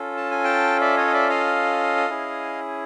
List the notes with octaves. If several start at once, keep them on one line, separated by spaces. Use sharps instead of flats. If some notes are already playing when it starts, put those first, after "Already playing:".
Already playing: C#4 F4 A4
A5
G#5
G5 A5
D5 E5
C#5 D#5
D#5
D5 E5
D#5 F5
C#4 E4 G#4